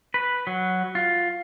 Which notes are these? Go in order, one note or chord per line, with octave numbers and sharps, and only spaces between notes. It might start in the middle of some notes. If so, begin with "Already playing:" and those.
B4
F#3
F4